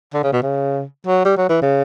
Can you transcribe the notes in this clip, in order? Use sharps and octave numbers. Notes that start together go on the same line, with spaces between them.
D3
C#3
B2
C#3
F#3
G3
F#3
E3
C#3